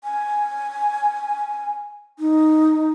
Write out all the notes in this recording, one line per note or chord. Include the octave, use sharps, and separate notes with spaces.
G#5
D#4